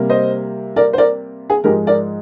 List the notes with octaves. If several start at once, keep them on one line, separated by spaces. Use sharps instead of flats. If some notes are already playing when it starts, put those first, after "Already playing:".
Already playing: C3 G3 A#3
C5 D#5
A#4 D5
C5
A#4 D5
G#4
G#2 F3 G#3 G4 A#4
A#4 D5